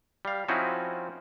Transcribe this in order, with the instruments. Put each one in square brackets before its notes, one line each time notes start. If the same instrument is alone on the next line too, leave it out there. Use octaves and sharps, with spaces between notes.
[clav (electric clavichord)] G3 F5
F3 C4 C#4 D#4 E4 F#4